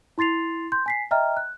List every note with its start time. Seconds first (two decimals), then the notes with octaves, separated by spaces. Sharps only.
0.18 E4 C6 A6 C7 F7
0.72 C6 G6
0.86 G#5 B6 C7
1.11 D#5 E5 G5 A#5 F6
1.37 F#6